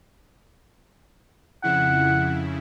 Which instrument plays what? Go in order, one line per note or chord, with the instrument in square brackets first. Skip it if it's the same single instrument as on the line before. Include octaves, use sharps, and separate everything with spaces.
[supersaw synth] F2 C#3 E4 [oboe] F#5